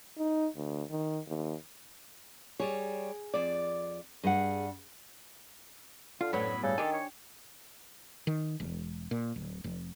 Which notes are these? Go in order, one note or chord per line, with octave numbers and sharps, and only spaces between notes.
D#4
D2
D#3
D#2
G3 G#4 C#5
F2 D5
G2 G#4 F#5
D3 F4 F5
F#2 A2 F#3 B3 C#5 B5
G2 C#3 A4
D#3 D4 G4 G#5
C#5
D#3
E1
A#2
D1
F1